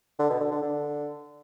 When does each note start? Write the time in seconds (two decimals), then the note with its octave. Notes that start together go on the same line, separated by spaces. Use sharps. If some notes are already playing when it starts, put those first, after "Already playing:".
0.19 D3
0.30 B2
0.41 D3
0.51 D3
0.62 D3